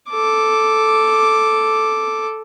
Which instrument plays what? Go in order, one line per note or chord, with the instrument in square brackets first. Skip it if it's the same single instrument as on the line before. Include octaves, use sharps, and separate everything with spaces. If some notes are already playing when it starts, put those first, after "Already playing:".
[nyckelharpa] A4 D6